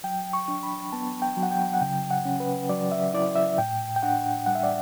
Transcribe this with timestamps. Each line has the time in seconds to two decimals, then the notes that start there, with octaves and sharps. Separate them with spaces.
0.04 F#3 G5
0.33 C#6
0.48 D4
0.63 B5
0.92 B3 A5
1.22 G5
1.37 F#3
1.43 F#5
1.51 G5
1.74 F#5
1.81 C#3 G5
2.11 F#5
2.25 C#4
2.40 B4
2.69 F#3 D5
2.92 E5
3.14 E4 D5
3.36 E5
3.58 A2 G5
3.96 G5
4.03 D4 F#5
4.46 G3 F#5
4.55 E5
4.63 D5